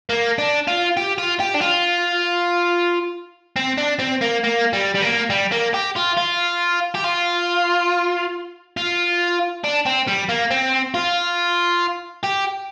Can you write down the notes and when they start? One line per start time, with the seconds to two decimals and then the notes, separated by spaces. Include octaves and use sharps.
0.09 A#3
0.39 D4
0.68 F4
0.97 G4
1.18 F4
1.40 G4
1.55 D4
1.62 F4
3.56 C4
3.78 D4
4.00 C4
4.22 A#3
4.44 A#3
4.73 G3
4.94 G3
5.02 A#3
5.30 G3
5.52 A#3
5.74 G4
5.96 F4
6.17 F4
6.94 G4
7.04 F4
8.77 F4
9.64 D4
9.86 C4
10.07 G3
10.29 A#3
10.50 C4
10.94 F4
12.24 G4